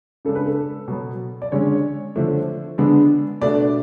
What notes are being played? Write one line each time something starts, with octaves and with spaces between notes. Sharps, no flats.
C#3 G#3 D4 A4
B4
A4
B2 F#3 B3
D5
D3 G#3 C#4 C#5
D3 F3 A3 D4
D3 G#3 B3 D4
B2 A3 D4 D5